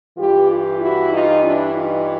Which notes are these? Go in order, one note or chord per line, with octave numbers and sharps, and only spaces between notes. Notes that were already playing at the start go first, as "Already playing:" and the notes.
G2 E3 F4 G4
F4 G4
E4 F#4
D#4 F4
D4 E4
D#4 F4